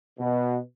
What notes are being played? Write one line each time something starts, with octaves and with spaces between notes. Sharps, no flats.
B2